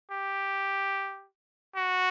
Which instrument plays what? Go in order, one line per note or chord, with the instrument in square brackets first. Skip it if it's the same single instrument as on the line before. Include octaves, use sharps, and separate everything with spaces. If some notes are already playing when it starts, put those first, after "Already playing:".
[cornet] G4
F#4